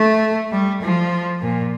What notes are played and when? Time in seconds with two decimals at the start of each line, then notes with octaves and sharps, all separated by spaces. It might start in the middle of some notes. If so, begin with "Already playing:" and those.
Already playing: A3
0.51 G3
0.82 F3
1.41 A#2